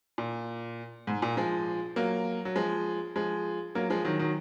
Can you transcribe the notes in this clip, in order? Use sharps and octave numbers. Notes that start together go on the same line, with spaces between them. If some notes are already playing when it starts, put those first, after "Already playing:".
A#2
G#2
A#2
F3 G#3
F#3 A#3
F#3
F3 G#3
F3 G#3
F#3 A#3
F3 G#3
D#3 F#3
D#3 F#3